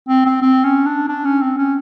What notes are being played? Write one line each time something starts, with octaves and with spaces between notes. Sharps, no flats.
C4
C4
C4
C#4
D4
D4
C#4
C4
C#4